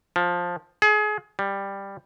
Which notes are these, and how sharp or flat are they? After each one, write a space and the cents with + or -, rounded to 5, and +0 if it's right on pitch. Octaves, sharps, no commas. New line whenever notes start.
F3 +10
G#4 +30
G3 +10